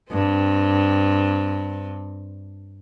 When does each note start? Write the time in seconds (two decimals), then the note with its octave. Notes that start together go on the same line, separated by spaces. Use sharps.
0.11 G2 C4